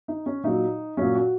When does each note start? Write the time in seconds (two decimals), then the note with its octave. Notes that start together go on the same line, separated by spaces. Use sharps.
0.08 D#4
0.26 C#4
0.44 A#2 F#3 D#4
0.97 A#2 F#3 C#4
1.15 F#4